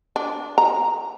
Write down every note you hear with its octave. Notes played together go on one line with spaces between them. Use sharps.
D4
A#5